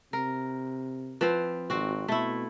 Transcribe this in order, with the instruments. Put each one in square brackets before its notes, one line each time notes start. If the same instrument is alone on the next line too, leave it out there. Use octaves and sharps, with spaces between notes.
[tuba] C3 [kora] A#4
[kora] F3 C4 [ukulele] B4
[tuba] G#1 [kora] C4 F#4
[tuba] B2 [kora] A3 E4